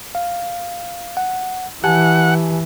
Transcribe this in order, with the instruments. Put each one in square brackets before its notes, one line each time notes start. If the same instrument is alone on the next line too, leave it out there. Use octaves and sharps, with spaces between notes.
[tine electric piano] F5
F#5
[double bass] E3 [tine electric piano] G4 G#5 A5 [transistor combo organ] F#5